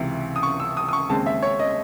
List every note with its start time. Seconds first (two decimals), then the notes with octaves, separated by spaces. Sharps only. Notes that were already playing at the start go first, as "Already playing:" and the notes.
Already playing: C#2 C3 E3
0.36 D#6
0.43 C#6
0.60 E6
0.77 D#6
0.89 D#6
0.93 C#6
1.10 D#2 C#3 G#3 C4 A5
1.26 E5
1.42 C#5
1.59 D#5